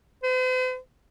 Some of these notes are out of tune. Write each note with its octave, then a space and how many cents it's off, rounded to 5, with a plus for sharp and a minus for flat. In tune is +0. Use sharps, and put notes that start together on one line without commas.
C5 -45